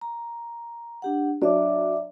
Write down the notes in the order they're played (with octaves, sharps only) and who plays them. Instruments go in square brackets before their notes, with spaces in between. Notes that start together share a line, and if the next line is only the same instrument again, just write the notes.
[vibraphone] A#5
D4 G4 F#5
[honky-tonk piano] F#3 D4 [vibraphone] D5 E5 D6